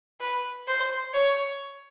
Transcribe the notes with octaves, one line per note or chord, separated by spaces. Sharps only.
B4
C5
C#5